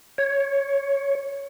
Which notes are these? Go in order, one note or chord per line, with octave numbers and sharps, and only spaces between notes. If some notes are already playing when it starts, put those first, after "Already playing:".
C#5